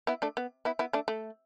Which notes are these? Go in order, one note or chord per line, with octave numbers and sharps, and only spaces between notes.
B3 E4
A3 D4
B3
B3 E4
B3 E4
A3 D4
A3